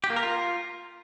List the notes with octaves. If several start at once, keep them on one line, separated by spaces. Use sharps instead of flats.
G4
A#3
A#4
F4